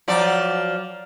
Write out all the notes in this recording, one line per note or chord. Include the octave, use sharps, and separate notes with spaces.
F3 F#3 D5